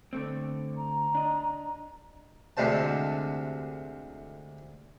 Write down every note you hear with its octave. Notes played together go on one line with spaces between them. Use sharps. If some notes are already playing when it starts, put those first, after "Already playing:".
D3 A3 C4
A#5
D4 D#5
D2 C3 G#3 C5 A5